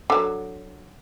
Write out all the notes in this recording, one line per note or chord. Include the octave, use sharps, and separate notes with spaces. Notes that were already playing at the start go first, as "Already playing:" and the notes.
D3 F#3